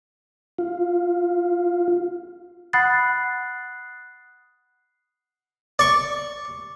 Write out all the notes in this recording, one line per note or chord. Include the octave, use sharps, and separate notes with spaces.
F4
F#5 B5 D#6 F#6 A6 C7
D5 C#6